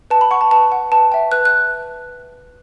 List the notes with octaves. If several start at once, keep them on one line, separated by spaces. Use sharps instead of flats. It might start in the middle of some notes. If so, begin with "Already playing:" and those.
B4 A5
B5
F#5 C#6
A5
B4 A5
F#5
B4 A5
E5 G5
B4 F#6
F#6